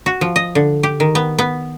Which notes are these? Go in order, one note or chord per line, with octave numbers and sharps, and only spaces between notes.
F#4
F3
D#5
D3
G4
D#3
B3
B3